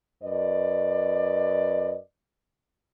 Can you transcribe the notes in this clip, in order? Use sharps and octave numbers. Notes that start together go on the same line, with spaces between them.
F#2 B4 D5 D#5